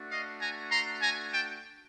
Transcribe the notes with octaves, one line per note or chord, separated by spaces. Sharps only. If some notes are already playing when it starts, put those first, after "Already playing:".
Already playing: A3 D4 F#4
D#5 F5
G#5 A#5
A#5 C6
G#5 A#5
G5 A5